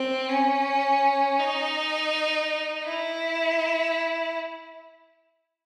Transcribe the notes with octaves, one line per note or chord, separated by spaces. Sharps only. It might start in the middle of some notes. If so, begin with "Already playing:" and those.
Already playing: C4
C#4
D#4
E4